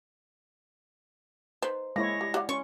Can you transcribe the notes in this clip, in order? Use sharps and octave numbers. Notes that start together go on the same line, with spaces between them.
D#4 B4 C5
G#3 A#3 E4 C#5 A#6
G3
F#4 G4 D5 F5
C#4 C6 C#6